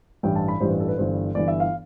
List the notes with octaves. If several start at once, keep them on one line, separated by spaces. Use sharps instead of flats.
A1 G2 E3 G3 G5
A5
B5
A1 G2 E3 G3 C5
B4
A4
B4
G1 G2 E3 C5
G1 G2 E3 D5
E5
F5